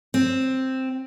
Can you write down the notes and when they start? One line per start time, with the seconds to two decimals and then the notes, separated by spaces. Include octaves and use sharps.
0.14 C4